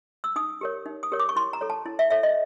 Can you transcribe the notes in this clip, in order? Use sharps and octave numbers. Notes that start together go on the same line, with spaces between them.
E6
D#4 D#6
G4 A#4 C#5
D#4
D#6
G4 A#4 C#5
D6
C#6
E4 C6
A#5
A4 C#5
A5
E4
E5
A4 C#5 E5
D#5